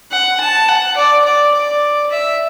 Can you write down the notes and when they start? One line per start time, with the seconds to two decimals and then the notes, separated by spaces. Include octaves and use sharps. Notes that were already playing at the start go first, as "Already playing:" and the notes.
0.11 F#5
0.41 A5
0.69 F#5
0.97 D5
1.25 D5
1.54 D5
2.11 E5